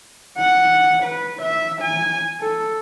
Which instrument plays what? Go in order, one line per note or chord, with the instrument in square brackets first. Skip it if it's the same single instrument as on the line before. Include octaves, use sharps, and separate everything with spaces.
[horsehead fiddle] F#5
B4
E5
G#5
A4